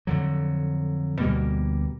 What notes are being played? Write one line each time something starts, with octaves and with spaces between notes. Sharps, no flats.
F2 D3 F#3
D2 B2 G3 A#3